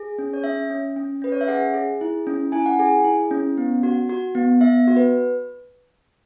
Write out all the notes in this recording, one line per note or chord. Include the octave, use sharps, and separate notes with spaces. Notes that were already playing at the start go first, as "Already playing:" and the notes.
Already playing: G#4
C#4
C#5
C#4 E5
C#4
C#4
C#4 B4
C#5
E5
G#4 F#5
G#4
E4
C#4
E4 G#5
F#5
G#4 G#5
E4
C#4
B3
F#4
F#4
B3
B3 E5
F#4
B4